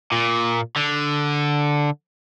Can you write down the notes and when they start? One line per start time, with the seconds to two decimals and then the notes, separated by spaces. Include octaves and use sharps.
0.12 A#2
0.76 D3